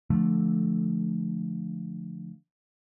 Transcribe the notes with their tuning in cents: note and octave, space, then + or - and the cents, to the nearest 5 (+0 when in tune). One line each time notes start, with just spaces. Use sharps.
D3 +0 F3 +0 A3 -15